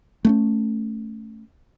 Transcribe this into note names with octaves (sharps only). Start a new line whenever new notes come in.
A3 B3 C#4